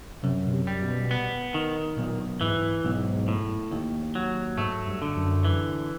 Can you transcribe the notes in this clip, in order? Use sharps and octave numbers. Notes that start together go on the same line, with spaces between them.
F#2 C3
B2
C3
G3
B2
B3
D#3
B1 A#2
G#2 E3
B1 G#2
A2
D#2
F#3
G#2 A3
G2
D3
F#2
E3